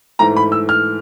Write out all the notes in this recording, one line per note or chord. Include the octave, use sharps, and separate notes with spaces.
G#2 E3 A3 A#5
B5
E6
F6